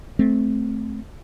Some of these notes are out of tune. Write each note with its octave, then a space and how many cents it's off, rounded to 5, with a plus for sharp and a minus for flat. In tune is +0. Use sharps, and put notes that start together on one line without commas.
A3 -20 C4 -5